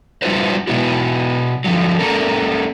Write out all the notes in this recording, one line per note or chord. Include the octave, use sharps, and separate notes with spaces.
G3 D4 F4 F#4 B4 C5
B2 F#3 G#3 B3 E4 F#4
D3 F3 F#3
A#3 C#4 A4 A#4